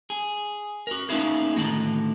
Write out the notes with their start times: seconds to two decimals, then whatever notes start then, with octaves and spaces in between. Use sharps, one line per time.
0.10 G#4
0.87 F#4 A#4
1.09 A#3 B3 C#4 D#4 E4 G#4
1.56 A2 D3 D#3 A3 F#4